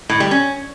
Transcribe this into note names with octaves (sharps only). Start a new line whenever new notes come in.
A2
G3
C#4